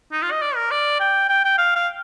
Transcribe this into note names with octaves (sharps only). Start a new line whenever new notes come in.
D#4
F4
D#5
D5
A#4
D5
G5
G5
G5
F5
F5